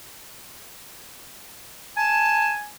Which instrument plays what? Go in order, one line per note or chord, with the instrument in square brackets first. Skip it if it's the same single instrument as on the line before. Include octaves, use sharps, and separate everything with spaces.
[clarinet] G#5 [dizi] A5